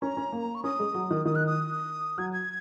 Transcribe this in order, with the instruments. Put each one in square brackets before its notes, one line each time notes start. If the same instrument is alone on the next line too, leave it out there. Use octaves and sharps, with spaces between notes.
[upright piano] C#4 [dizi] A#5
[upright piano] C#4
A#3
[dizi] C#6
[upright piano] C#4 [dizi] D#6
[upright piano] G#3
F#3
D#3
[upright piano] D#3 [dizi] D#6
[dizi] F#6
D#6
[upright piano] F#3 [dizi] G#6
[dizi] G#6